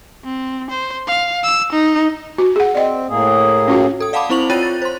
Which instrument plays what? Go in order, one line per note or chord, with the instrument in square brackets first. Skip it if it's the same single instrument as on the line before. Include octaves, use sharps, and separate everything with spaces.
[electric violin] C4
C5
F5
E6
D#4
[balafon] F#4
G#4 F#5
[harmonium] C4 [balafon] D5 D#5
[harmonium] A2 A#3 G#4
[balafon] C#4 F4 F#4
[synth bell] A4 D#6
D5 F5 F#5 A5 B5 D6
C4 E4 C5 C#6 F7 F#7
F4 C#5 G5 F#6 A6 D#7
A6
C5 C6